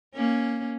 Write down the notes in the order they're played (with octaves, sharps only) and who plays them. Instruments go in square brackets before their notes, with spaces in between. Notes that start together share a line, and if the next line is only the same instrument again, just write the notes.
[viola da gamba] A#3 C#4